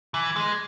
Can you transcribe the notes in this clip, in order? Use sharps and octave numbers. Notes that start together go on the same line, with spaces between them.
E3
G#3